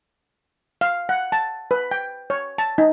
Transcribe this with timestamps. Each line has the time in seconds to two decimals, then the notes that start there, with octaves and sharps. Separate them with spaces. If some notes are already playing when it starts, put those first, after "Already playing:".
0.81 F5
1.09 F#5
1.32 A5
1.71 B4
1.91 G5
2.30 C#5
2.58 A5
2.78 D#4